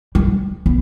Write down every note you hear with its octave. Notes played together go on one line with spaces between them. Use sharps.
G3
B3